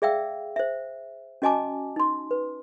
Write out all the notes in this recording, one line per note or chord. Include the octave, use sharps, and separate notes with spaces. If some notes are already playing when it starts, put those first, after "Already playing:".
G#4 D5 E5 F5 G5 E6
C5 E5
C#4 F#4 D#5 G#5 A5 D6
D#4 C6
B4